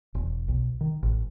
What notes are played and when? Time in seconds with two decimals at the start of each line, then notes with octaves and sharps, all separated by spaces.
0.15 E1
0.48 B1
0.81 D#3
1.03 A1